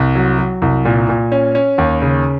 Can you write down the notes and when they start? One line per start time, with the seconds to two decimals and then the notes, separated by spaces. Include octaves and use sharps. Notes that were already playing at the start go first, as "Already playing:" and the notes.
Already playing: C2
0.15 F#3
0.39 F#3
0.62 C2
0.85 A#2
1.09 A#2
1.32 C#4
1.55 C#4
1.78 D#2
2.02 C#3